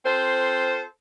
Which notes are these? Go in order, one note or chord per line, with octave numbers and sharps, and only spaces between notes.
C4 F4 A4 C5